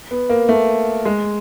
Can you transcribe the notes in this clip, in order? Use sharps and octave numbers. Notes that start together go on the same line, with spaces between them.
B3
A#3
A3
G#3